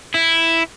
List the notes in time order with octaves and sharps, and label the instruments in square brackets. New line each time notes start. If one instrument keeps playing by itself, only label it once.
[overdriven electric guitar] E4